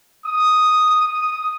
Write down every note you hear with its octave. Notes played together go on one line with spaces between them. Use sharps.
D#6
D#6